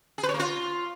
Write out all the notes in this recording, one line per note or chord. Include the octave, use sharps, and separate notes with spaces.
G#4
B4
C#5
A#3
F4